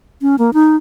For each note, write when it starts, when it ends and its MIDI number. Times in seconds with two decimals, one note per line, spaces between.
0.22 0.36 61
0.39 0.50 58
0.54 0.76 63